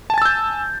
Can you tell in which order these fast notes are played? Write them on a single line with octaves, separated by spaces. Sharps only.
A5 G#5 A6 E6 G6